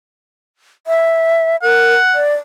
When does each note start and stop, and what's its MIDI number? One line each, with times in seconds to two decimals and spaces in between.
0.87 1.56 76
1.62 1.94 70
1.62 2.21 78
2.14 2.33 74